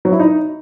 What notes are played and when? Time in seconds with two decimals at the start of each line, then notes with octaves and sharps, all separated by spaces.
0.05 F#3
0.12 E4
0.20 D#4